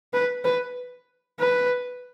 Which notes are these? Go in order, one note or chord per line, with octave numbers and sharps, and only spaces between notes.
B4
B4
B4